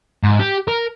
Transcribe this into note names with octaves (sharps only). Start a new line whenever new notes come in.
G#2
G4
A#4